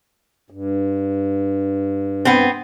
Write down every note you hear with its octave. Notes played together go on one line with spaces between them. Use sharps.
G2
B3 C4